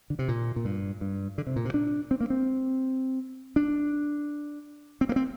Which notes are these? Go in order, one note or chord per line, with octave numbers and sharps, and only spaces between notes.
D3
C3
A#2
A#2
G2
G2
D3
C3
A#2
C3
D4
C4
A#3
C4
D4
C4
A#3
C4